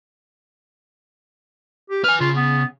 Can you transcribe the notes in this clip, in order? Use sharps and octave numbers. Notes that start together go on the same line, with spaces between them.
G4
B4 G#5 F6
C#3 F4
B3